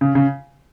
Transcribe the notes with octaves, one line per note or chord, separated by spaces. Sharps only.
C#3
C#3